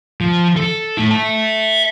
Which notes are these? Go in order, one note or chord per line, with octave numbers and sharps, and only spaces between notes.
F3
A4
A3 E4
E5 A5